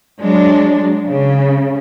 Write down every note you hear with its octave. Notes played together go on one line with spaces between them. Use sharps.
F#3 G#3 D4
C#3